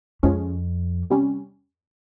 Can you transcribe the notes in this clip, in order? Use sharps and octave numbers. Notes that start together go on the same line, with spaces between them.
F2 F3 G#3 C#4
C3 G3 C#4